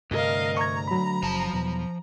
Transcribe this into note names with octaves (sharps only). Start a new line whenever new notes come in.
D2 G2 C3 A#4 D#5 F5
A#5 C#6 G#6
F#3 B5
F#1 C#3 F3 A5
E2 B2